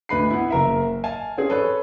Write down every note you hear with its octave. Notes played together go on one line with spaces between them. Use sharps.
D2 B4 B5 C7
B3 E4
F#1 A#4 E5
F5 G#5 A5
C4 C#4 G#4
A4 B4 C#5